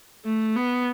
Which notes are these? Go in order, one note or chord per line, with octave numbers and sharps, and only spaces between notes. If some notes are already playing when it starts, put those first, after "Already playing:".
A3
B3